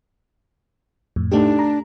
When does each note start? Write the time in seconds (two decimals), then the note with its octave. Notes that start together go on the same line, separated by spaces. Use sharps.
1.16 F2 A2
1.32 A3 D4 D#4 G4
1.59 A#5